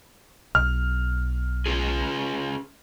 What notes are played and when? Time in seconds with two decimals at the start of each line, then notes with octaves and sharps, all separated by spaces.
0.55 B1 F6
1.66 C#4 F4 G#4